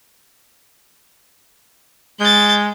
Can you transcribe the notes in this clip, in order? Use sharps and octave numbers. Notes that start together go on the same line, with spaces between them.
G#3 G6 A6